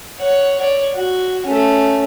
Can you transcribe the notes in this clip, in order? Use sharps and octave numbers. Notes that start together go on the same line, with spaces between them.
C#5 F#5
C#5 D5
F#4
A3 C#4